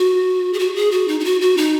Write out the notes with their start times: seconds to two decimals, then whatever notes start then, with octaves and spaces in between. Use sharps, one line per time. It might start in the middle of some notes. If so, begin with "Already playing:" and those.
Already playing: F#4
0.53 G#4
0.59 F#4
0.76 G#4
0.91 F#4
1.08 D#4
1.20 D#4
1.24 F#4
1.41 F#4
1.57 D#4